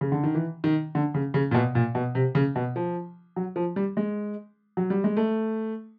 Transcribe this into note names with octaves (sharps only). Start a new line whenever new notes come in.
C#3
D3
D#3
E3
D#3
D3
C#3
C#3
A#2
B2
A#2
B2
C3
C#3
B2
F3
F#3
F3
G3
G#3
F#3
G3
G#3
A3